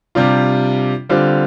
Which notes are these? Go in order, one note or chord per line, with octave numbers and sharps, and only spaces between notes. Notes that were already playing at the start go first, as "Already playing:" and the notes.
C3 G3 D4 F4
D3 G3 C4 F4